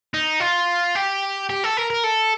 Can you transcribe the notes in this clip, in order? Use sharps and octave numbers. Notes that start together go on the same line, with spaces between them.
D#4
F4
G4
G4
A4
A#4
A#4
A4